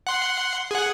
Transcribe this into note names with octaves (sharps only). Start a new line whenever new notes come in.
F#5 C6
G#4 F#5